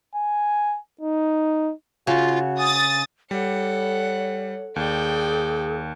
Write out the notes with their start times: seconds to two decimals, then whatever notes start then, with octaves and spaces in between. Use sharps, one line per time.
0.16 G#5
1.01 D#4
2.07 C#3 F4 F#4
2.59 G#5 D#6 A6
3.31 G3 A4 C#5 F#5
4.76 D#2 G#4 D5 G5